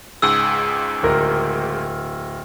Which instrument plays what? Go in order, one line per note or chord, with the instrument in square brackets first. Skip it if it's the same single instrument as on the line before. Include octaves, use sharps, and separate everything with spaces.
[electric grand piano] C#2 G#2 G#4 [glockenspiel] E6
[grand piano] D1 A#4